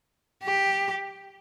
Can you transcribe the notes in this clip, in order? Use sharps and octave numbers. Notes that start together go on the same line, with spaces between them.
G4